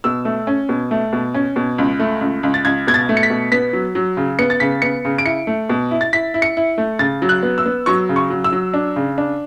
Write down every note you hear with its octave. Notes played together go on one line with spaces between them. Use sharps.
B2 E6
A3
C#4
B2
A3
B2
C#4
B2
C#2
A3
C#2
C#2
A6
C#2 G#6
B2 G#6
A6
A3
C#7
B6
B2
B3 B6
F#3
F#3
C#3
B3 C#7
A6
C#3 B6
B3 C#7
C#3
D7
E4 C#7
A3
B2
E4
A6
E4 B6
E4
C#7
E4
A3
C#3 A6
F#3
F#6
B3
E6
B3
F#3 C#6
C#3
C#6
F#3
E6
F#3
D4
C#3
D4